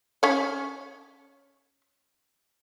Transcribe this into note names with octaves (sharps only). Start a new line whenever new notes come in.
C#4 C#5